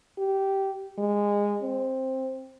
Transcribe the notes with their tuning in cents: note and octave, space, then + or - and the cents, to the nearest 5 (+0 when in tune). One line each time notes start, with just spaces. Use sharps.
G4 -15
G#3 -20
C4 +10